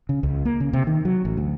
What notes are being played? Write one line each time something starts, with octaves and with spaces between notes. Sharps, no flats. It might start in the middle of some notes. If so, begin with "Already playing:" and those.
C#3
C#2
A#3
C#3
C3
D#3
F#3
A1
D2